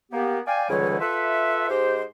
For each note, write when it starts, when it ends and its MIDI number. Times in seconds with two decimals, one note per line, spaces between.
0.12 0.39 58
0.12 0.39 59
0.12 0.39 67
0.47 0.66 74
0.47 0.66 77
0.47 0.66 79
0.47 0.66 80
0.69 1.00 37
0.69 1.00 44
0.69 1.00 50
0.69 1.00 52
0.69 1.00 55
0.69 1.00 73
1.00 1.67 65
1.00 1.67 69
1.00 1.67 71
1.00 1.67 76
1.69 2.02 44
1.69 2.02 56
1.69 2.02 67
1.69 2.02 72